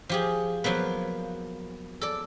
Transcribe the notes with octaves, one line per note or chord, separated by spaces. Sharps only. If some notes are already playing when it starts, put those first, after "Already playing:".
F3 G4 G#4
F3 F#3 A#3 B3
A4 D5